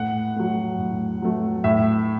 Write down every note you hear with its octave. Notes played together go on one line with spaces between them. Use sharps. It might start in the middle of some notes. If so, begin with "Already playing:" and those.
Already playing: A2 F#5
F#3 A3
A2
F#3 A3
A2 E5